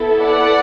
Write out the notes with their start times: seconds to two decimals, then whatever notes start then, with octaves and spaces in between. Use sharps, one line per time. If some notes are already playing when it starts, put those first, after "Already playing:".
Already playing: B3 E4 A4
0.22 D5 F#5